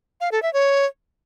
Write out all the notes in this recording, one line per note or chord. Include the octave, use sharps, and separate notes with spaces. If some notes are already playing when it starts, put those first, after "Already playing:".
F5
A4
E5
C#5